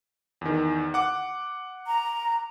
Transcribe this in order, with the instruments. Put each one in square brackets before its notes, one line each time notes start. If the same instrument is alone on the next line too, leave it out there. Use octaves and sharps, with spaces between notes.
[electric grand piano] E2 D#3
F#5 D6
[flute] A#5